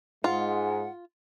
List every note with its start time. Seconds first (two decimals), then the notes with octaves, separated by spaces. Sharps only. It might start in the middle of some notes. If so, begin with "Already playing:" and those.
0.24 G#2 G#3 F4 F#5